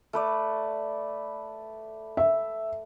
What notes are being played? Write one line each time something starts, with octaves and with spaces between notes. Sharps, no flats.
A3 B4 D5
E5